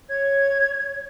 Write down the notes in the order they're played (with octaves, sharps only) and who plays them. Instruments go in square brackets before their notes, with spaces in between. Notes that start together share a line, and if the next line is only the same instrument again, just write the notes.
[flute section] C#5 G#6